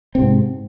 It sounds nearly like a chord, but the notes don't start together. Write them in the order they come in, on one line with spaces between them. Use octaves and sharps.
C4 C3 G#2